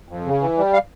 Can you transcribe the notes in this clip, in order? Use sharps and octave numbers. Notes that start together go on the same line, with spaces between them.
F2
C#3
E3
G3
F5